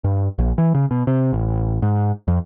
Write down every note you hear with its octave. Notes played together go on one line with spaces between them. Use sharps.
G2
A#1
E3
C#3
B2
C3
A1
G#2
F2